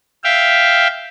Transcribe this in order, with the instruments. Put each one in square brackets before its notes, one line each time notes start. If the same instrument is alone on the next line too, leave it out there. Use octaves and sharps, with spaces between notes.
[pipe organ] E5 F5 G5